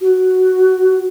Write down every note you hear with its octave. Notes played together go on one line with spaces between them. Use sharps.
F#4